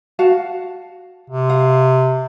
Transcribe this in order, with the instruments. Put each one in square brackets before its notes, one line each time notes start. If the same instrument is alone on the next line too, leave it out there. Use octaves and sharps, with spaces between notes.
[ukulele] F#4 F5 A5
[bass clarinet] C3
[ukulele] F5